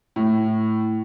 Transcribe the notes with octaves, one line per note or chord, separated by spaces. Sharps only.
A2